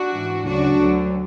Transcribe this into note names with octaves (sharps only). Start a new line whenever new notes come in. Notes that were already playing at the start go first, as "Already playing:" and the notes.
Already playing: D4 F#4
G#2 E3
D2 C#3 F#3 D4 F#4
D2 D3 F#3